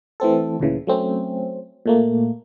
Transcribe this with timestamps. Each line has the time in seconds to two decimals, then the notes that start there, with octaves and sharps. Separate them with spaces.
0.20 E3 A3 C4 A4
0.60 D2 A#2 C#3 E3
0.87 F#3 A3 C4 C#4
1.86 A#2 A3 A#3